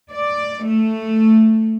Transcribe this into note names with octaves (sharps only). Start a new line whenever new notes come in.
D5
A3